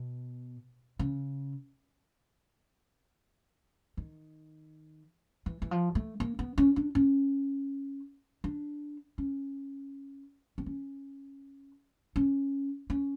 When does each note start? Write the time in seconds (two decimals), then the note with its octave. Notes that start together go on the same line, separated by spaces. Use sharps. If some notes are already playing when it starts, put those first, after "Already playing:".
Already playing: B2
0.99 C#3
3.97 D#3
5.46 E3
5.62 E3
5.71 F3
5.95 A3
6.20 A#3
6.39 B3
6.58 C#4
6.76 D4
6.95 C#4
8.44 D4
9.18 C#4
10.58 C4
10.66 C#4
12.16 C#4
12.90 C#4